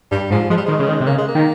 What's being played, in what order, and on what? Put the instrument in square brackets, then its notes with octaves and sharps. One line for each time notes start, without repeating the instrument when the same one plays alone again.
[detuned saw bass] G2 [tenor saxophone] G3
[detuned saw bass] G#2 [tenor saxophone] F3
[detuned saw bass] F3 [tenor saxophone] G#3
[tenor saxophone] G3
[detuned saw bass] D#3 [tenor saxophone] G#3
[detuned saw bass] C#3
D#3
C3
[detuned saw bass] C#3 [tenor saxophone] A#3
[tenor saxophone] G#3
A#3
[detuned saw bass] D#3